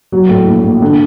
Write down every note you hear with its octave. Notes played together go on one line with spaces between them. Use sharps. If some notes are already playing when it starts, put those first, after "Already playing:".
F#3
A2
A#1
A#1
D3